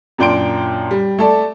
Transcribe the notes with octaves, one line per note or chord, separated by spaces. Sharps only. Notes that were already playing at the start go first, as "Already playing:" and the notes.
F#2 A#2 D4 G5 C6 D7
G3
A3 A4 D5